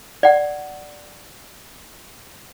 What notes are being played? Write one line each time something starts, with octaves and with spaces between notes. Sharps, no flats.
D5 F#5